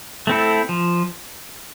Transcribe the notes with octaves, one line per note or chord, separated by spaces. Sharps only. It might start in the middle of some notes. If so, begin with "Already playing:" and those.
A3 C4 E4 A4
F3